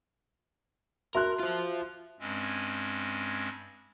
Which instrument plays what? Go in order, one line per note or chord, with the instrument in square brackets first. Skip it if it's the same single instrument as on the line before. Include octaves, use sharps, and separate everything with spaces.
[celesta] F#4 C6 [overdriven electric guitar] A#4 [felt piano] E5 F#6
[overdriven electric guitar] F4 C5
[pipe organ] G2 G#3 C4 C#4